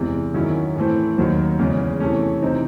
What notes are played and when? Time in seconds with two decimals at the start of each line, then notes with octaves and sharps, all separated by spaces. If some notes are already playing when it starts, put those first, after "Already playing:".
Already playing: E2 C3 E3 G#3
0.34 F#2 D#3 F#3 C#4 E4
0.76 A2 E3 A3 C4
1.17 D#2 D#3 F#3 C4
1.59 E2 C#3 G#3 C#4
2.00 C3 E3 A3 C#4
2.42 C3 E3 C4 D#4